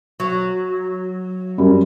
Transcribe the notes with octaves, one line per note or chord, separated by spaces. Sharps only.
F#3
F#2 G3